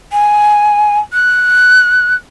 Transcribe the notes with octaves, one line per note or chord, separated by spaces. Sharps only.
G#5
F#6